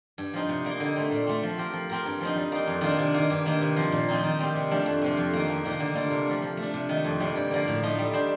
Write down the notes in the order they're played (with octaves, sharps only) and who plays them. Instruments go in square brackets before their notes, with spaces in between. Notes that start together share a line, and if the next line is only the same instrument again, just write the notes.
[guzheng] G2
F3 C4 D#4
C3
G3 A#3 D#4
D3
A3 C4
A#2
A3 C4
F3
C4 G4 A#4
F3
C4 G4 A#4
G2
F3 C4 D#4
G3
A#3 D#4
F2
D#3 A#3 D4 F4
C3
D#3 A#3
G2
D#3 A#3
C3
F3 C4
A#2
F3 C4 D#4
D#3
G3 C4 G4
C3
F3 A3 D4 G4
F2
C3 F3 C4
F2
D#3 A#3
F2
C3 D#3 A#3 D4
D3
G3 A#3 F4 A4
C3
F3 A3
F3
A3 D4
C3
D#3 A3 D#4
F2
C3 G3 A#3
G2
D3 F3 A#3
A2
F3 A3 D#4
G3
D4 G4 C5